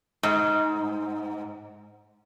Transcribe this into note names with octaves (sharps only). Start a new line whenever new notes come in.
G#2